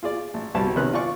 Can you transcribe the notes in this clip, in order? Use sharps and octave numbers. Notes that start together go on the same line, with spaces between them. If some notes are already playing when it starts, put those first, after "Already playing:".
F4 G#4 D5
A1
C2 B2 G3 G4 A5
C3 D#3 B3 C#4 A#4 F#6
F4 D5 C#6